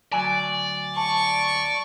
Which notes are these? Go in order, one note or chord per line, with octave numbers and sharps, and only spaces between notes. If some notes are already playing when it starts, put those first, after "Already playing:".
D2 F#3 D5 G#5
A5 C#6